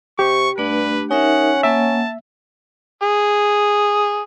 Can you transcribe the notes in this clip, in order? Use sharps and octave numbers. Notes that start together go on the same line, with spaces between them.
C3 G4 C#6
G2 A3 D4 B4
C#4 D#4 A#4 E5 F#5
A#3 E5 F#5 A5
G#4